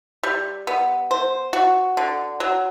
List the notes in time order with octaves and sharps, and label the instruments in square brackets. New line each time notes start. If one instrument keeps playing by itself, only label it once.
[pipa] G3
B3
C5
F#4
D3
F#3